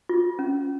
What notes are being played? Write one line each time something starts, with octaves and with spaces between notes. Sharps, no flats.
F4
C#4